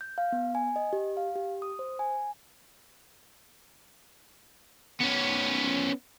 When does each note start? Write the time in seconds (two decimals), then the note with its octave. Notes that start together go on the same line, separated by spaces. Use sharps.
0.01 G6
0.18 F5
0.32 B3
0.55 G#5
0.76 D#5
0.93 G4
1.17 F5
1.36 G4
1.62 D#6
1.79 C5
1.99 G#5
5.01 B3 C#4